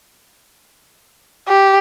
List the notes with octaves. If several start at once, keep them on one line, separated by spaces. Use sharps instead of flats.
G4